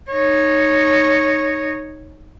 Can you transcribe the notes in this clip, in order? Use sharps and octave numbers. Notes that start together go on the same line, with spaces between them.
D#4 C#5